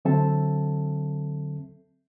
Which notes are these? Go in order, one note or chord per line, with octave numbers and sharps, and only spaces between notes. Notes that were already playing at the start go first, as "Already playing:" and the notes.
D3 F#3 C4 A4 E5 A5